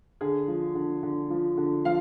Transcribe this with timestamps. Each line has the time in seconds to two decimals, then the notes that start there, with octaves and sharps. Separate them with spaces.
0.21 D3 G#4
0.48 F3
0.75 D3
1.03 D3
1.30 F3
1.57 D3
1.85 F3 F5